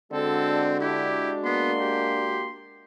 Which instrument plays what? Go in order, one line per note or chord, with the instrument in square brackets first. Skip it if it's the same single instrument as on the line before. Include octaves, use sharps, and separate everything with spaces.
[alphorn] D3 [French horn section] G#3 D4 F#4 [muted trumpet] C4 [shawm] A4
[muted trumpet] E4 [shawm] G4
[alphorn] A#3 [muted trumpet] B3 [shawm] C6
[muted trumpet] G4